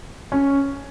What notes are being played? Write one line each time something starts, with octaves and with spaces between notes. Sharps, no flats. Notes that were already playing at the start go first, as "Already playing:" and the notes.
C#4